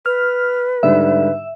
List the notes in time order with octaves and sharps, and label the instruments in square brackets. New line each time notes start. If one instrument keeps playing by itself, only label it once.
[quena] B4 [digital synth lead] F6
[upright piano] G#2 D3 G3 [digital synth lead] E5